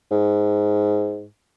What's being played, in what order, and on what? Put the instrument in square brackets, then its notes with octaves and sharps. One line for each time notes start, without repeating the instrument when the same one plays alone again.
[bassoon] G#2